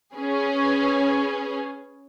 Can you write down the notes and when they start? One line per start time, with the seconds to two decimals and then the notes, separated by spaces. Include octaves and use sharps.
0.16 C#4 G#4 B4